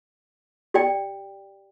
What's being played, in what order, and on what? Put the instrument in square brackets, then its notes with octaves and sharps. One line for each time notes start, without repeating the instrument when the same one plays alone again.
[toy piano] G4 D5 G5